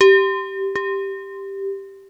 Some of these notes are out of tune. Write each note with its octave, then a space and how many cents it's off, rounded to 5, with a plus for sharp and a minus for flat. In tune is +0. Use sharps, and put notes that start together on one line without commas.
G4 -10
G4 +0